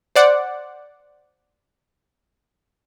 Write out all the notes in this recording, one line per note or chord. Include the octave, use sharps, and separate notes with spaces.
C5 D5 F#5